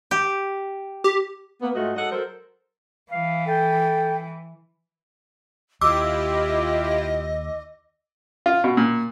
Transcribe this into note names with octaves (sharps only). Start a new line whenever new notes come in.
G4
G4
A#3 B3
G#2 A3 F4 F#4 D#5
F#3 G#3 A4 D#5 F#5
F#3 A4 A#4 C5
E3 F5
A4 G5
D#2 E4 F4 G4 D#5 D6 E6
F4
B2
A#2